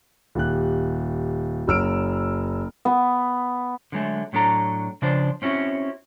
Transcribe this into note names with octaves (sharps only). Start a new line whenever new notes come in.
D#1 G4 F#6
F#1 F#3 E6 F6 D7
B3
D3 F#3 G#3 A3
A2 F#3 D4 A4 A#5
C#3 F3 D4 C5
C4 C#4 E4 F#4